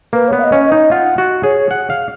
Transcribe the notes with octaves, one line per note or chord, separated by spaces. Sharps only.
A#3 B4
B3 C#5
F5
D#5
C#4
D#5
D#4
F4 F#5
F#4
G#4 C#5
F#5
F5